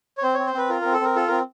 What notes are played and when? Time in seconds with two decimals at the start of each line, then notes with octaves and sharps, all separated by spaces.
0.18 C#5
0.23 C4 C5
0.34 C4 C#5
0.46 C5
0.54 C4 B4
0.69 F4 A#4
0.81 C4 A#4
0.93 A4
1.01 C4 A#4
1.16 F4 A4
1.28 C4 A#4